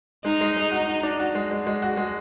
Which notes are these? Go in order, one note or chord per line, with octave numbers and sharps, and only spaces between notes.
G#3 D#4
G#3
G#3
F#4
F#4
D4
F#4
G#3
G#3
G#3
F#4
G#3